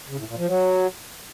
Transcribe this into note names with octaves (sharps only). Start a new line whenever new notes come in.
C#3
A2
A#2
F3
F#3